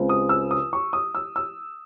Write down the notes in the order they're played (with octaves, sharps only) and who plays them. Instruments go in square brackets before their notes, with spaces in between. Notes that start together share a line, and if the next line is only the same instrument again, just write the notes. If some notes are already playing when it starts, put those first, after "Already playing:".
Already playing: [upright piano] C#2 C#3 G#3 C4
D#6
E6
D#6
C#6
D#6
E6
E6